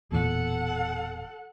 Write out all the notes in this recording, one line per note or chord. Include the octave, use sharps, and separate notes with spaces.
E1 E2 A#2 A4 F#5